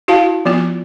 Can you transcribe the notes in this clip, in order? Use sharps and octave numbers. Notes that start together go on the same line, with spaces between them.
E4 F#4 F5 A5
F3 B3 F4